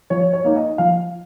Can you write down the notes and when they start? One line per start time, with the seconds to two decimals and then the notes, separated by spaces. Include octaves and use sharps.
0.10 F3 C#5
0.33 C#5
0.44 A#3 D#4
0.56 D#5
0.78 F3 F5